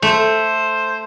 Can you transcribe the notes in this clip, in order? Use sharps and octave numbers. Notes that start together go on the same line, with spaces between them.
A3 C5